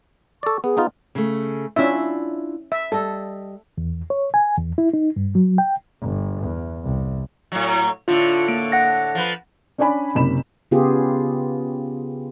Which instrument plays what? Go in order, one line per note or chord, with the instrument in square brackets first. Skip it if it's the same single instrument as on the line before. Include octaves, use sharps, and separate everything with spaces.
[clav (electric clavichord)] A4 D5 [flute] C#6
[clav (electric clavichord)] B3 [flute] G#4
[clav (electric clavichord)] B3 D#4 F4
[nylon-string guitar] C#3 A3
[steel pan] C#4 E5 [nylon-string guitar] D4 E4 F4
[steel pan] E5
[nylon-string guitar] G3 D#5 [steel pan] A4
[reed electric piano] E2
C#5
G#5
E2
E4
D#4
G2
F#3
G5
[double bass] G1
E2
C2
[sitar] A2 F#3
[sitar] A2 D3 [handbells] F4
[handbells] A#3 D7
F#5 A#6
[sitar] F3 B4
[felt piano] C#4 D4 C#5 D5 G#5 B5
F#1 C3 B5 E7
[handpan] C#3 B3 F4 G4 G#4